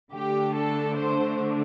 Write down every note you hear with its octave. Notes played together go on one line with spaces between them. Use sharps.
D3 A3 D4 G4
A4
C5